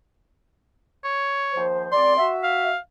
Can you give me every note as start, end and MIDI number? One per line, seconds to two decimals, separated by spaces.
1.04 1.63 73
1.54 1.87 39
1.54 1.87 53
1.54 1.87 72
1.92 2.15 37
1.92 2.15 60
1.92 2.15 74
1.92 2.28 84
2.18 2.71 66
2.18 2.71 76
2.43 2.77 77